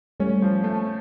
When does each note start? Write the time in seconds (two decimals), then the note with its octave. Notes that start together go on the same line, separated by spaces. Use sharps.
0.20 G3 A3 C#4
0.42 F3
0.64 A3